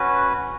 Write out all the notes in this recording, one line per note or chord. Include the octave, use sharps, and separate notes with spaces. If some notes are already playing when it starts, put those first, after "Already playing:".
Already playing: C#4 F#4 B4